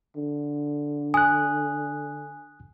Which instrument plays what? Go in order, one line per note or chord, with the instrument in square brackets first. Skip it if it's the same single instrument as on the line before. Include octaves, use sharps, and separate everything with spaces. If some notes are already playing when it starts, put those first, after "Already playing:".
[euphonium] D3
[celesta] G#5 [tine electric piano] D#6 F#6